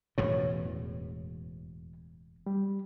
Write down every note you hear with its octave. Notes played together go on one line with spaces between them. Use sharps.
E1 F#2 A2 C#5
E2
G3